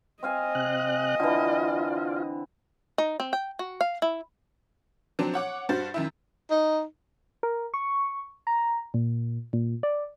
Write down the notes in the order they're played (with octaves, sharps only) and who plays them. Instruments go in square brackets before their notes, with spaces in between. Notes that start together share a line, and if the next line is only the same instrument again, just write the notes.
[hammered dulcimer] C4 F5 G#5 [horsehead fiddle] D#5
[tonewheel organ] C3 F#6
[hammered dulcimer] D3 E3 [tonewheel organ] F4
[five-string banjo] D#4
C4
G5
F#4
F5
E4
[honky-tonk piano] F3 F#3 C4 D4
C#5 F#5 D6
G2 F#4 C5 A6
F#2 D#3 E4
[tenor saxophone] D#4
[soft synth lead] A#4
C#6
A#5
A#2
A#2
D5